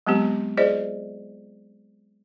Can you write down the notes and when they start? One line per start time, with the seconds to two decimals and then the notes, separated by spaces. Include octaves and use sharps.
0.07 F#3 G#3 B3 C4 G4
0.57 F4 G#4 C5 D5 D#5